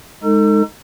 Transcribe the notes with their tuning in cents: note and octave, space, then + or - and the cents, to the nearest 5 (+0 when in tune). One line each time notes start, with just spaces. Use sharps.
G#3 +0 D#4 -5 A4 +35